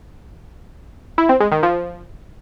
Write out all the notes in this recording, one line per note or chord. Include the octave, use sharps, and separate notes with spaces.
E4
C4
G#3
D#3
F3